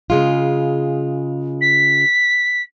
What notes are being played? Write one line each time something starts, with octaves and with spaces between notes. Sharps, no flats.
C#3 G#3 F4
B6